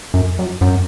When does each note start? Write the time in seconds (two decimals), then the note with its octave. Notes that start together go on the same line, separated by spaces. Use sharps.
0.14 F#2
0.39 F#2
0.61 F#2